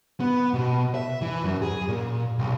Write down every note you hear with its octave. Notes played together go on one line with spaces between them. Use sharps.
B3
B2
E5
E3
F#2
G#4
A#2
B1